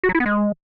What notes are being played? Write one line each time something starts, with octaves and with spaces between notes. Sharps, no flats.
F#4
F#3
E4
B3
G#3